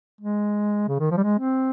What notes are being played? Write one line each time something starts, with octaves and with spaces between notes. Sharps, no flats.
G#3
C#3
D#3
F3
G3
G#3
C4